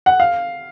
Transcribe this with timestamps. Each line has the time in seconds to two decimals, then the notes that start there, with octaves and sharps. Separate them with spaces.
0.06 F#5
0.20 F5